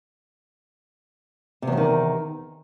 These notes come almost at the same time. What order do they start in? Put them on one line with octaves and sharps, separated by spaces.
C3 E2 F#3 D#3